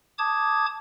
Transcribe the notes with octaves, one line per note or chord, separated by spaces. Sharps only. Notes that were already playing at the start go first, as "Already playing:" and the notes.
A5 D6 D#6 G#6